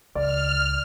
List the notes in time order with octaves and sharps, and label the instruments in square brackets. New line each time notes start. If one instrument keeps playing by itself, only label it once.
[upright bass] C#2 [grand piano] D5 [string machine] F6